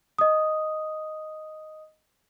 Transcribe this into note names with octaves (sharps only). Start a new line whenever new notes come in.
D#5 D#6